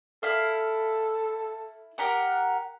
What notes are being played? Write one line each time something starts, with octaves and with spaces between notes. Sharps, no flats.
E4 A4 F5
G4 A#4 F#5